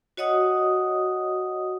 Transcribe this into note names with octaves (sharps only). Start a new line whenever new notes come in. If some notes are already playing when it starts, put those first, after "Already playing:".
F#4 C#5 D#5 F#5 D#6